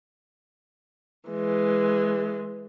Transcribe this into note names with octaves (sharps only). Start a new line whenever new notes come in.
E3 G#3